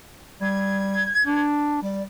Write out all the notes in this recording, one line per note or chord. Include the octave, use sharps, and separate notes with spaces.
G3 G#6
D4
G3 D5